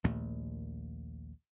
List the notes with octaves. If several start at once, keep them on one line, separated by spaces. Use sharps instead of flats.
A#1 D#2 A#2 A3